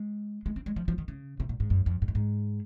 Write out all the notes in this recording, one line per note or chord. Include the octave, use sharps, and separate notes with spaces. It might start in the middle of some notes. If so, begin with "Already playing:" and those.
Already playing: G#3
G#3
C4
G#3
F3
F3
D#3
C#3
C3
A#2
G#2
F#2
F2
G#2
F#2
G#2